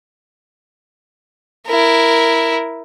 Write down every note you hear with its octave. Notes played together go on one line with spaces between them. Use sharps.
E4 A#4